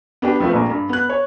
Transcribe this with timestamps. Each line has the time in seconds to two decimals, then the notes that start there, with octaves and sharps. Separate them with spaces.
0.22 B3 D4 G4
0.40 F3 A3 C4 B4
0.53 A#1 A#3
0.70 G2
0.89 B3 F#6
1.09 C#5